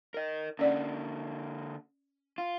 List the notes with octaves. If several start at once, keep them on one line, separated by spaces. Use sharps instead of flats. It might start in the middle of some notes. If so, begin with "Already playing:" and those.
A#4 D#5
D3 A#3 C#4 D5 F#5
F4